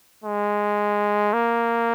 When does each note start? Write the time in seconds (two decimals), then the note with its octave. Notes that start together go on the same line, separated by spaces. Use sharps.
0.24 G#3
1.33 A#3